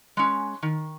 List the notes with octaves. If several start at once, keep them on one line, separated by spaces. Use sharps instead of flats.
G#3 C#4
D#3